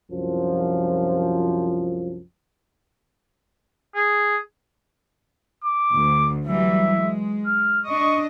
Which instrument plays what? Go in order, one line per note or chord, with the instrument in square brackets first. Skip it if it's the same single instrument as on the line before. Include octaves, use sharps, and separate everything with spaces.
[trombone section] C2 F#2 F3
[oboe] G#4
[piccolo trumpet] D6
[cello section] D2
[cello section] E3 F#3 G3 [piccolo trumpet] E5
[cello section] G#3
[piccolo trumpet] F6
[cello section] D4 D#5 [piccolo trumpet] C#6